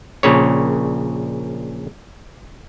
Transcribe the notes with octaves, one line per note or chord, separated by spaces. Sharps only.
A#1 A#2 C#3 C#5